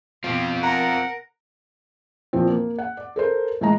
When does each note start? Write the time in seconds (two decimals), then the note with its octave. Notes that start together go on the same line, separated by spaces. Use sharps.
0.24 B2 C4 F4 G4
0.63 A#4 F#5 A#5
2.33 E2 A#2 F3 C4
2.50 A#3
2.79 F#5
2.97 D5
3.16 A4 A#4 C5
3.61 A2 E3 G#3 D#5 A#5